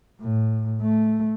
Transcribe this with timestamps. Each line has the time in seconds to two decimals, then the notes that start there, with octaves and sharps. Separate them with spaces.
0.22 A2
0.82 A3